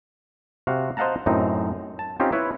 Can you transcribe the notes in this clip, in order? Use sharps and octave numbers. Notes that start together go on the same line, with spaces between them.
C3 F#4 F5
C5 D#5 F5 F#5 A5 A#5
F#2 A2 C4 D#4
A5
C4 C#4 D#4 F4 G4
E4 B4 C#5